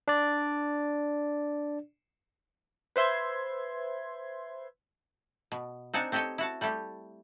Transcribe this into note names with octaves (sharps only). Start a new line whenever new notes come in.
D4 D5
B4 C5 E5 C6 G#6
B2
C4 D4 D#4 F#5 G#5 A5
C4 G4 A4 C#5 D#5 G5
E4 F#4 A5
G3 A3 E4 G4